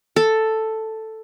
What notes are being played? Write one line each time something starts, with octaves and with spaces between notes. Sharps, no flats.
A4